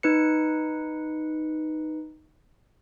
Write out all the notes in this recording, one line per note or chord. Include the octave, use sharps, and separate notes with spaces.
D#4 B4 C#7